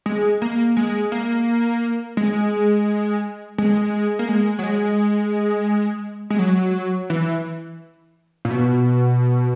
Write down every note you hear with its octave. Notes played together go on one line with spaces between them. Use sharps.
G#3
A#3
G#3
A#3
G#3
G#3
A#3
G#3
F#3
G#3
G#3
F#3
E3
A#2
B2